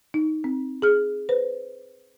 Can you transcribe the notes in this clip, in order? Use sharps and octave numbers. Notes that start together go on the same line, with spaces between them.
D#4
C4
G#4 F6
B4 C5